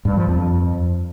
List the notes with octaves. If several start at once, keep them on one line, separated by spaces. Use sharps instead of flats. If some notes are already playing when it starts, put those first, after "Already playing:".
G2
F3
F2